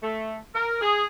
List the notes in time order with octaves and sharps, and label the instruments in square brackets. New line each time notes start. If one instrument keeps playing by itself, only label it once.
[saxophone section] A3
A#4
G#4